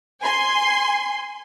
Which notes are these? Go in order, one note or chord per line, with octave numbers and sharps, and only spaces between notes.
G#5 C6